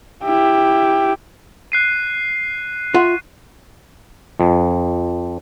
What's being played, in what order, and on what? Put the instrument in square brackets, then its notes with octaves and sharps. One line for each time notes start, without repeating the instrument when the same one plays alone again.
[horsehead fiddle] E4 G4
[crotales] F#6 C7 D#7
[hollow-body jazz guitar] F4 E5 F#5 [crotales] C#6 D#7
[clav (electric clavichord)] F2